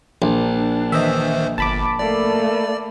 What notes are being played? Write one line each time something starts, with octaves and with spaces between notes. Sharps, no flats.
A#1 D4
D#3 E3 C5 D#5 E5
G1 A5 B5 D6
A3 A#3 D5